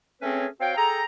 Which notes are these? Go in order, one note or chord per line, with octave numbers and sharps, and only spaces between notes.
A3 C4 C#4 G#4 B4 C#5
C4 F#4 C#5 F5 G5
G#4 A4 G5 A#5